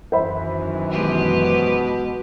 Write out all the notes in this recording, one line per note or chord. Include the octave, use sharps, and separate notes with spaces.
F#2 D#3 E3 C5 E5 B5
B2 G#3 G4 B4